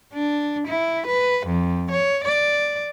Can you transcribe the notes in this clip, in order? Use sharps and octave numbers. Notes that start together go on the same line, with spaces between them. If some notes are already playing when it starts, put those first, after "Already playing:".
D4
E4
B4
F2
C#5
D5